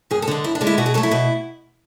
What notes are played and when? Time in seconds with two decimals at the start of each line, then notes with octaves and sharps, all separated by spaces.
0.11 F#2 G#4
0.22 A4
0.28 D3 G#3
0.44 F#2 E4
0.55 D4
0.61 D3 G#3
0.67 E4
0.78 B2 F#4
0.86 G#4
0.94 F#3 A3 A4
1.03 E4
1.11 B2